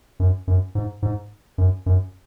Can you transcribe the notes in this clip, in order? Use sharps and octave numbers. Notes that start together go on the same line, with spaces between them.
F#2
F#2
G#2
G#2
F#2
F#2